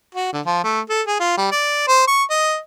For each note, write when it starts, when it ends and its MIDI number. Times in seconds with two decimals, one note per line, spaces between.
0.15 0.29 66
0.33 0.41 50
0.46 0.63 53
0.64 0.80 57
0.89 1.02 69
1.07 1.19 68
1.20 1.34 65
1.37 1.47 55
1.51 1.85 74
1.88 2.06 72
2.07 2.24 85
2.30 2.59 75